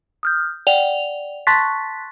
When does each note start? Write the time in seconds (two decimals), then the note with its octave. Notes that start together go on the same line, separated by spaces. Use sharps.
0.23 D#6 F6 G6
0.67 D5 F#5 G5 F7
1.47 A5 C6 C#6 F#6 A6 B6